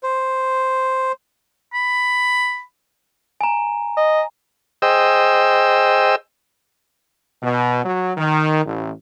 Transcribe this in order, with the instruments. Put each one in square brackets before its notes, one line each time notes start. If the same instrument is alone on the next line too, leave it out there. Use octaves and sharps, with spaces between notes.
[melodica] C5
[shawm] B5
[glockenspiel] G#5 A#5
[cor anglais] D#5
[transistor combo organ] G#4 C5 D#5 G5 E6
[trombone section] B2
F#3
D#3
A1